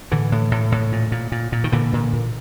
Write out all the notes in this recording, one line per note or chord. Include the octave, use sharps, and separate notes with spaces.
A2 D3 E3
A2
A2
A2
A#2
A#2
A#2
A#2
D#3
A#2 D3 E3
A#2
A#2